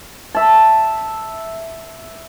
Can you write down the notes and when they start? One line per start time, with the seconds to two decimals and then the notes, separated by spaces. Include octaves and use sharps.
0.34 E5 A5